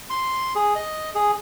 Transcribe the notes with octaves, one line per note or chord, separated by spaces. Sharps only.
C6
G#4
D#5
G#4